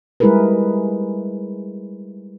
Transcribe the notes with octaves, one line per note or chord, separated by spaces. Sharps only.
G3 G#3 E4 G#4 A#4 B4